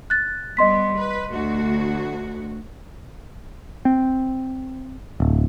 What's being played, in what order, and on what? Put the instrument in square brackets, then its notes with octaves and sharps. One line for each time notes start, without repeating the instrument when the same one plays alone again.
[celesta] F#6 A6
[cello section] G3 B3 [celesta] D#5 C6 B6
[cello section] B4
D2 F#4
[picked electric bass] C4
D1